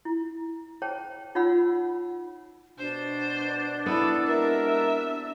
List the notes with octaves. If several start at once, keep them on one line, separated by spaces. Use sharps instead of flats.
E4
G#4 C5 C#5 G5 A5
D#4 F4 C#5 F#5 B5 E6
B2 D4 C5
B3 E4 A4
C3 G#3 A#4 E5